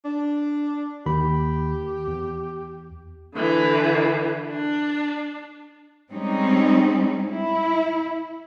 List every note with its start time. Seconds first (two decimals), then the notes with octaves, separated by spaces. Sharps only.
0.05 D4
1.06 D#2 D#3 G4 B5
2.08 E2
3.35 D3 E3
4.49 D4
6.11 G3 G#3 C4 C#4 D#4
7.29 E4